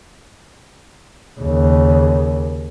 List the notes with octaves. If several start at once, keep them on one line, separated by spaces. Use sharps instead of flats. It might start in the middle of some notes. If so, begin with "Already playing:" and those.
D#2 C#3